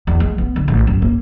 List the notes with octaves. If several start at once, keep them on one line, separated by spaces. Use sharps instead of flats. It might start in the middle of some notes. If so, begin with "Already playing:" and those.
E2
G#3
B3
D3
A1
F#2
A#3